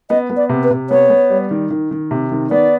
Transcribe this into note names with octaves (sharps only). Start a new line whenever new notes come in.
B3 D#5
B3
D5
C3
B4
C3
B3 C#5
B3
G3
D#3
D#3
D#3
C3
D#3
B3 D5